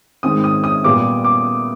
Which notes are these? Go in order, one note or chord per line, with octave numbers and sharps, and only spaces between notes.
G#2 D#3 G#3 C4 D#6
D#6
D#6
A#2 G3 B3 D6
D6